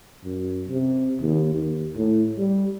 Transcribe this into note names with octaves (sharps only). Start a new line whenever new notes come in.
F#2
C3
D#2
D#2
A2
G3